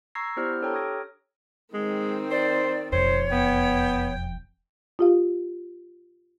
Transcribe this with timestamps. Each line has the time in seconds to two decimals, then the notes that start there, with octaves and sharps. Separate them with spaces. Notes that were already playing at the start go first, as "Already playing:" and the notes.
0.15 A#5 C#6 E6 G#6 A#6 C7
0.36 B3 E4 G4 C5 D5 F6
0.61 D4 G4 A4 C#5 G5 A#5
0.73 C#6 D#6 F6 G#6 A#6 D7
1.74 D#3 G#3 C4
2.31 C5 D5
2.92 E1 F2 C5 C#5
3.32 B3 G5
4.99 F4 G4 F5